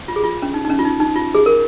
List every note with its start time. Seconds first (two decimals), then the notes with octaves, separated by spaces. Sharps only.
0.08 F4
0.16 G#4
0.24 F4
0.42 C#4
0.54 D#4
0.65 D#4
0.70 C#4
0.79 F4
0.85 D#4
1.00 D#4
1.16 F4
1.35 G#4
1.46 A#4